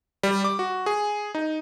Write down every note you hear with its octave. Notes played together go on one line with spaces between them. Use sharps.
G3
D6
F#4
G#4
D#4